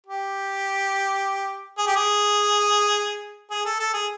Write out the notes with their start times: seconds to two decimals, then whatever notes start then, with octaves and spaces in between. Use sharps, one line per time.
0.06 G4
1.78 G#4
1.87 G4
1.96 G#4
3.50 G#4
3.65 A4
3.79 A4
3.93 G#4